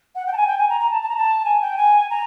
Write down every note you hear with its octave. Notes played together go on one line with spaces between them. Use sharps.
F#5
G5
A5
G#5
G5
G#5
A#5
A#5
A5
A5
A#5
A5
G#5
G5
G#5
A#5